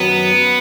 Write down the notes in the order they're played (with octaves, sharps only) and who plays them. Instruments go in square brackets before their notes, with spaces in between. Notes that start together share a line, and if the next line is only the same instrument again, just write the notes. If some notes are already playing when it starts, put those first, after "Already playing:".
Already playing: [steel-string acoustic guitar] F#2 D#3 F#3 [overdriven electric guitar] B3